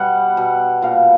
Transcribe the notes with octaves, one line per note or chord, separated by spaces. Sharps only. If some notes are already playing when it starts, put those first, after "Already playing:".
Already playing: B2 G3 B3 F#5
B2
A#2 F5